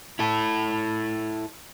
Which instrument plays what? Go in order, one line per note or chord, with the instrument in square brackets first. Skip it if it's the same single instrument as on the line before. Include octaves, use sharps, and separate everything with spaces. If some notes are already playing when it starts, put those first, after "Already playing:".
[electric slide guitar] E4 A4